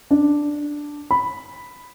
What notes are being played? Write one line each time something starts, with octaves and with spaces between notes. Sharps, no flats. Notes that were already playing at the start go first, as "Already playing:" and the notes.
D4
B5